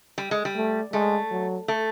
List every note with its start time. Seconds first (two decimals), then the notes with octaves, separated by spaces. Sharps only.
0.18 G3
0.31 G#3
0.45 G3
0.56 A3
0.93 G#3 A3
1.31 F#3
1.68 A3